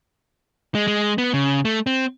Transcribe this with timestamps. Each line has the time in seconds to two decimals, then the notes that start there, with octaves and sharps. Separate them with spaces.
0.75 G#3
0.87 G#3
1.18 B3
1.34 C#3
1.65 A3
1.87 C4